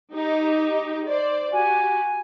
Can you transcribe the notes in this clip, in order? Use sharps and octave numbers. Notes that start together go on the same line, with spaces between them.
D#4 G4
C5 D5
F#4 G4 G#5